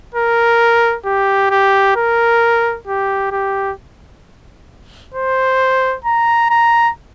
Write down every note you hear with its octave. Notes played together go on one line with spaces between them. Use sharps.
A#4
G4
G4
A#4
G4
G4
C5
A#5
A#5